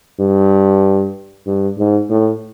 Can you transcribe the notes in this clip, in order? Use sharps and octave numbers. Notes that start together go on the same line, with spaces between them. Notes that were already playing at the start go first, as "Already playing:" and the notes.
G2
G2
G#2
A2